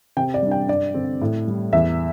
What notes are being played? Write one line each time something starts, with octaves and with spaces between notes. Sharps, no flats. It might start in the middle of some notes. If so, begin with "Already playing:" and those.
C3 G5
D5
G3 D4
G5
G2 D5
D3 C4
A2
G3 E4
E2 E5